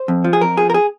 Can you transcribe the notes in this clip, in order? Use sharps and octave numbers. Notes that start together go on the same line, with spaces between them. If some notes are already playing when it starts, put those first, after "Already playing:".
Already playing: C5
F2
F3
G#4
F2 A#4
F3 G#4
A#4
G#4